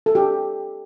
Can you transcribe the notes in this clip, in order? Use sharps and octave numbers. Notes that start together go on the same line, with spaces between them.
A4
G4